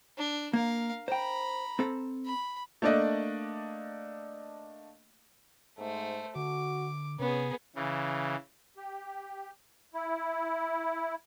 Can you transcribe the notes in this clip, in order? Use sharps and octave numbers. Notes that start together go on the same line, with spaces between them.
D4
A#3 A#4 F5
C5 G5 A#5 B5
C4 A4
B5
A3 A#3 D4 D5 D#5
G#2 A3 C5
D3 F#4 D6
C3 B3 C#4 G#4
C#3 E3
G4
E4